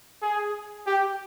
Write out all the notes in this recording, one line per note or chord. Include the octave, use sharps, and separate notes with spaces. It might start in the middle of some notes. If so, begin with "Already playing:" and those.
G#4
G4